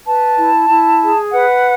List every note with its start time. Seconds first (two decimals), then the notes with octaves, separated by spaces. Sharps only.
0.05 B4 A5
0.37 E4
0.69 E4
1.01 G#4
1.32 B4 F#5